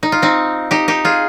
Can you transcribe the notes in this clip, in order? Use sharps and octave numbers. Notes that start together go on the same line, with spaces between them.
D#4
F4
C4 D#4
D#4 G4
D#4 G4
F4 G#4